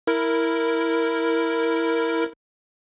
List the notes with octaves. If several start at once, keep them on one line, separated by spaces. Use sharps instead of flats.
E4 A#4